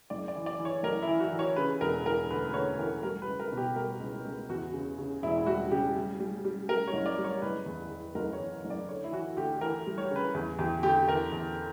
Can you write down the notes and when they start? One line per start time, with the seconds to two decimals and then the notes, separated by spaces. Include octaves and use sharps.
0.10 F#1 D5
0.28 D5
0.35 E3
0.46 D5
0.59 E3
0.65 C#5
0.83 F#1 A#4
1.02 E4
1.08 E3
1.20 F#4
1.32 E3
1.39 C#5
1.56 C#3 B4
1.81 E1 A#4
2.05 E3 A#4
2.30 D2 B4
2.48 B4
2.54 D2 C#5
2.78 E3 A#4
3.03 G3 A#4
3.22 B4
3.27 C#2
3.40 A#4
3.52 B2
3.57 G4
3.76 G3 A#4
4.00 C#2
4.25 C#2
4.49 E2 F#4
4.73 C#3
4.98 C#3
5.23 E1 E4
5.38 E4
5.46 G3 F#4
5.71 C#3 G4
5.95 G3
6.20 G3
6.45 G3
6.69 G3 A#4
6.87 C#5
6.93 F#1
7.06 D5
7.18 G3
7.24 C#5
7.42 F#1 B4
7.66 E2
7.90 E2
8.15 F#1 A#4
8.33 C#5
8.40 E2
8.65 F#1
8.70 D5
8.89 D2 C#5
9.04 E4
9.12 E3 F#4
9.37 D2 G4
9.61 E3 A#4
9.87 G3
9.98 C#5
10.10 C#3
10.16 B4
10.34 E2
10.59 E2 G4
10.83 D3 G4
11.07 E2 A#4
11.32 E2